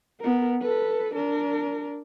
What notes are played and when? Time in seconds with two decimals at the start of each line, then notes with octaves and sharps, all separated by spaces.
0.21 B3 A#4
0.61 A4 B4
1.14 D4 A#4